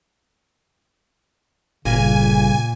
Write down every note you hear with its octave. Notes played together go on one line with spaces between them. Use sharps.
G1 A#2 C#3 G#5